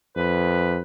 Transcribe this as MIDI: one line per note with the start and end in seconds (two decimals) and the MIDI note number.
0.16 0.80 41
0.16 0.82 71